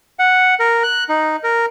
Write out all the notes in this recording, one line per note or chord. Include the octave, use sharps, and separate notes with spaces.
F#5
A#4
F#6
D#4
A#4